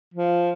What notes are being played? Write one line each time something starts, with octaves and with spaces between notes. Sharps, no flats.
F3